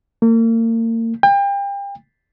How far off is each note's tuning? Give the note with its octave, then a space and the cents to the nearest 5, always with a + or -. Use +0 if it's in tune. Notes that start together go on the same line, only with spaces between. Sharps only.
A#3 -40
G5 +35